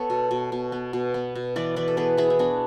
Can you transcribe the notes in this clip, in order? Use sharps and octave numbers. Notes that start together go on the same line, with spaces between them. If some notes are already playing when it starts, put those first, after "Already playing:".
Already playing: B3 A4 C#5
B2
B2
B2
B3
B2
B3
B2
E3 B4 D5
E3 B4 D5
A4
B3 G#4 B4
B3 E4 G#4
E4
B3 D4 F#4